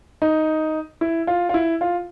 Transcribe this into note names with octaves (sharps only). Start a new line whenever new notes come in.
D#4
E4
F4
F4
E4
F4